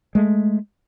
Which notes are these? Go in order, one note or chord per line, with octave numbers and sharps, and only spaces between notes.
G#3 A3